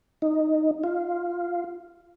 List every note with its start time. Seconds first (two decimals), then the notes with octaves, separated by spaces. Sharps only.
0.22 D#4
0.84 F4